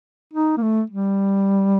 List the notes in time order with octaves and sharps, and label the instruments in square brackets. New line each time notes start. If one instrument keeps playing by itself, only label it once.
[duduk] D#4
A#3
A3
G3